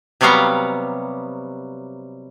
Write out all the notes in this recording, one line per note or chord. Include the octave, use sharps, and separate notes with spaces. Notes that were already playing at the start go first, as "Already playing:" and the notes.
C3 F#3 G3 B3 F5 A#5